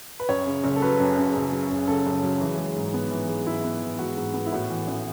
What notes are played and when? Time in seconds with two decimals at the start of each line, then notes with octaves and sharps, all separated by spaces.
0.20 B4
0.29 F#2 C#5
0.46 C#3
0.64 F#1
0.76 A4
0.82 F#3 B4
1.00 F#2
1.18 C#3
1.35 F#1
1.52 F#3
1.71 F#2
1.87 C#3 A4
2.06 F#1
2.23 F#3
2.41 E3 G#4
2.58 G#3
2.76 G#2
2.94 B3
3.11 E3
3.29 G#3
3.46 G#2 E4
3.64 B3
3.82 E3
3.99 G#3 F#4
4.17 G#2
4.34 B3
4.46 E4
4.52 A2 F#4
4.70 E3
4.88 A1